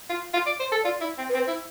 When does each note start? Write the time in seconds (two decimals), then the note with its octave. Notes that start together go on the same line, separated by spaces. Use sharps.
0.09 F4
0.33 F4
0.46 D5
0.60 C5
0.71 A4
0.84 F4 D5
1.01 E4
1.18 C4
1.29 B4
1.34 C4 C5
1.47 E4